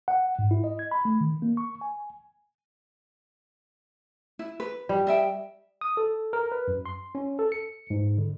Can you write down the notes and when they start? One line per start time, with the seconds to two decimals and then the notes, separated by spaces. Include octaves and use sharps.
0.08 F#5
0.39 G#2
0.51 E4
0.64 D#5
0.79 G#6
0.91 B5
1.05 A3
1.21 D#3
1.42 A#3
1.57 C#6
1.81 G#5
4.39 E4
4.60 B4
4.89 G3
5.07 D#5 E5 G5
5.81 D#6
5.97 A4
6.33 A#4
6.52 B4
6.68 F#2
6.86 C6
7.15 C#4
7.39 A4
7.52 C#7
7.90 G#2
8.18 D3